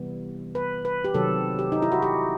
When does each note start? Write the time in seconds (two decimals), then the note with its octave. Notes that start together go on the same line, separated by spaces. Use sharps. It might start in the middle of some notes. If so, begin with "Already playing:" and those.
Already playing: C3 E3 G3 B3
0.55 B4
0.85 B4
1.04 G4
1.14 C3 D#3 F#3 C4 A4
1.59 G4
1.72 D#4
1.82 E4
1.92 F#4
2.02 G4